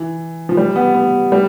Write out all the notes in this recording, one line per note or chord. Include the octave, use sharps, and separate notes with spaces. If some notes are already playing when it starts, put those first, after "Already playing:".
Already playing: E3
F3
G3
B3
B3
G3